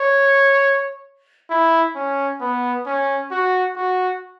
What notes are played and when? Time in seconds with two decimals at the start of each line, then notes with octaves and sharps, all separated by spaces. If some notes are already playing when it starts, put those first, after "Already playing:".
Already playing: C#5
1.50 E4
1.96 C#4
2.41 B3
2.87 C#4
3.32 F#4
3.76 F#4